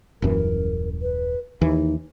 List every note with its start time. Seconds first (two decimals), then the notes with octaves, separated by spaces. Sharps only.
0.22 D#1 F#2 E3 A#4
1.02 B4
1.61 D#2 E3 D#4